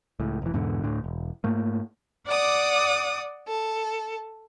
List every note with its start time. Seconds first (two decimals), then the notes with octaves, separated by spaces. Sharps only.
0.20 C#2 A2
0.42 F1 E3
0.54 E2 G#2 B2 D3
0.84 D2 A2 D4
1.04 E1
1.44 G#2 A3 A#3
2.27 D5 F#5 D6 D#6
3.47 A4